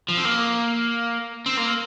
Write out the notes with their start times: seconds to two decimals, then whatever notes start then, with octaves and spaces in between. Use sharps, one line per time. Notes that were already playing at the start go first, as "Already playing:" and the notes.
0.08 F3
0.17 C4
0.25 A#3
1.46 C4
1.57 A#3